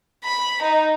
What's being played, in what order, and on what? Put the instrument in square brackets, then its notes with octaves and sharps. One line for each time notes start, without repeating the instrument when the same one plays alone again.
[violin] B5
D#4